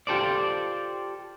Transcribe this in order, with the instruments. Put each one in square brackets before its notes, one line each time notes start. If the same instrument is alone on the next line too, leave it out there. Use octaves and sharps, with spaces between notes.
[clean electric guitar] F4 G4 A4 C5 D5